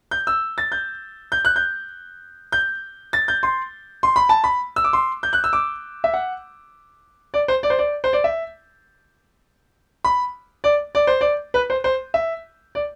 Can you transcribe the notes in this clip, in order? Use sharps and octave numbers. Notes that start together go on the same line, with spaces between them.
G6
E6
A6
G6
G6
F#6
G6
G6
A6
G6
C6
C6
B5
A5
B5
E6
D6
C6
G6
F#6
E6
D6
E5
F#5
D5
C5
D5
C5
D5
C5
D5
E5
B5
D5
D5
C5
D5
B4
C5
C5
E5
D5